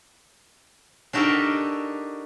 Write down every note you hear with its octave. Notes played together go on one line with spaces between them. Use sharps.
D4 D#4 F#4 G4 A4 A#4